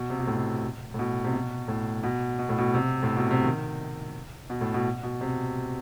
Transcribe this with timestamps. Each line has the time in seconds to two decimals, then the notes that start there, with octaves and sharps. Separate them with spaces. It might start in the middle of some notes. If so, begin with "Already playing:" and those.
Already playing: B2
0.10 C3
0.19 B2
0.27 A2
0.36 B2
0.94 A2
0.99 B2
1.24 C3
1.33 B2
1.68 A2
2.03 B2
2.39 B2
2.49 A2
2.58 B2
2.74 C3
3.03 A2
3.17 B2
3.31 C3
3.44 D#3
4.50 B2
4.61 A2
4.74 B2
5.03 B2
5.21 C3